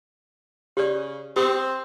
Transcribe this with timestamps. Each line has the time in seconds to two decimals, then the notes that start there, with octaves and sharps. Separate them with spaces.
0.77 C#3 G4 D5
1.36 C4 G4 D#6